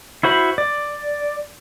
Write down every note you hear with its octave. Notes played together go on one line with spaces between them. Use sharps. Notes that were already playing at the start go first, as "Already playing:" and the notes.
E4 F#4 C5 B5
D5